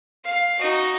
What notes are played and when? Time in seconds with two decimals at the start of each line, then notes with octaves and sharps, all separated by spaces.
0.25 F5
0.59 D#4 F#4